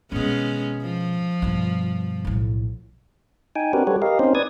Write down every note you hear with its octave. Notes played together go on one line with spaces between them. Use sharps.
G#1 B2 G#3 B3 C#4
F3
G2 B2
B1 A2
D#4 G5 G#5
C4 D4 F#4 G4 A#4 B4
G3 F#4 G4 A4 B4 C#5
G4 A#4 D#5 F5
C4 C#4 D#4 C5
B4 D5 D#6 G#6